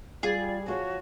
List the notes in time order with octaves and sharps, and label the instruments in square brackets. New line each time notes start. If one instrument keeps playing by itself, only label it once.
[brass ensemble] G3 [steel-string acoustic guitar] F4 [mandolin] G#4 [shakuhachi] D5
[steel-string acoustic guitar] F3 F4 C#5 [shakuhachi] F#4